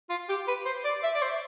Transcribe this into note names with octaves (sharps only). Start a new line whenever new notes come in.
F4
G4
B4
C5
D5
E5
D5
C5